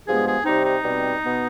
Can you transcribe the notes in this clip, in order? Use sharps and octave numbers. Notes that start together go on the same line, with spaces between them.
G2 F3 G#3 B3 G#4
G#4
C3 G3 C4 D#4
D#4
B2 G3 C4
B2 B3